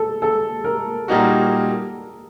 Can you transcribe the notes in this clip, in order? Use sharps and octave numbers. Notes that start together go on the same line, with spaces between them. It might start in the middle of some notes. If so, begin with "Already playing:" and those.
Already playing: A4
A4
A#4
A#2 G3 A#3 D#4 F#4